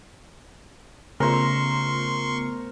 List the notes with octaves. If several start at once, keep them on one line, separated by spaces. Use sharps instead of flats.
C#3 A3 B3 F4 A#4 C5 C6 C#6